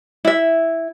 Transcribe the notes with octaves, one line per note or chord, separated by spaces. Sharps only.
E4 E5